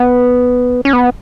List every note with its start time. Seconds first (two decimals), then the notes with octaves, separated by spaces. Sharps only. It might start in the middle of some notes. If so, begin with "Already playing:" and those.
Already playing: B3
0.85 C#4
0.93 B3